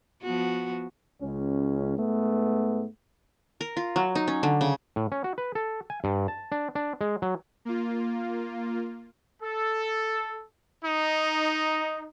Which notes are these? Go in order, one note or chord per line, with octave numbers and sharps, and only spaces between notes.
F3 B3 F#4
C#2 C#4
G#2 A3 B3
A#4
F4
F#3
D#4
C#4
D3
C#3
A2
C#4
F#4
B4
A4
G#5
G2
A5
D4
D4
G#3
F#3
A#3 F4
A4
D#4